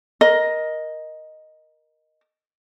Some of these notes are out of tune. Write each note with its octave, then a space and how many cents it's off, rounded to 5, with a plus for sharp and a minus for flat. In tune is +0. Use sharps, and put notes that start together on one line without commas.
A#4 +15 D#5 +0